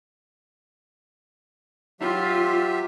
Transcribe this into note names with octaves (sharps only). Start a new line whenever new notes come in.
F#3 F4 G4 E5